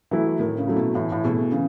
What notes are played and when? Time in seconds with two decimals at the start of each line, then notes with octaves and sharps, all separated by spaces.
0.11 E3 F#3 A3 E4
0.39 A2 D#3
0.58 C#3
0.67 F#3 A3 E4
0.76 B2
0.95 A2 E3
1.12 A2
1.24 B2 A3 E4 G#4
1.52 C#3 E3